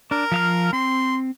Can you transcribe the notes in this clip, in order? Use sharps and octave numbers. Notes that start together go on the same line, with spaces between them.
D4 A#4
F3 F5 F6
C4 C6